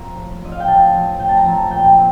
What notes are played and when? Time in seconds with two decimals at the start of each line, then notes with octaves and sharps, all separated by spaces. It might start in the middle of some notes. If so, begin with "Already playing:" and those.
Already playing: F3 C4 A#5
0.16 A2
0.42 F3 C4 D#5
0.52 F5
0.60 G5
0.67 A2 A5
0.93 F3 C4
1.19 A2 G5
1.29 A5
1.37 A#5
1.45 F3 C4
1.53 A5
1.71 A#2 G5
1.96 C4